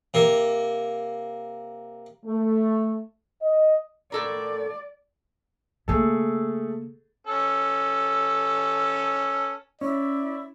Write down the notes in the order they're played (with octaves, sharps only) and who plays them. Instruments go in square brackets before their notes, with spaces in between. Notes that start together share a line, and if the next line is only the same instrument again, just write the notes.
[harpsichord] C3 A#3
[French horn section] A3
D#5
[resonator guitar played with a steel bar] A2 A4 A#4 [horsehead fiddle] D5
[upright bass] C#3 A#3 [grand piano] A3 G#4 A4
[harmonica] C#4 A4
[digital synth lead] C#4 [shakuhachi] E4 [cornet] D5